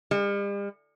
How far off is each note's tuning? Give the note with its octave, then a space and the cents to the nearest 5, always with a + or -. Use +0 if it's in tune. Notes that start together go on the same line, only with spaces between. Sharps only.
G3 +45